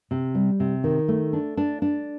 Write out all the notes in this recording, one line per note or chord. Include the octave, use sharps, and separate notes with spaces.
C3
G3
C3
D#3
A3
D4
D4
D4